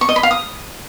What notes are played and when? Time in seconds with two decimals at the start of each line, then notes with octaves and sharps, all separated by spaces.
0.01 C#6
0.09 D#5
0.16 B5
0.23 F5
0.31 D#6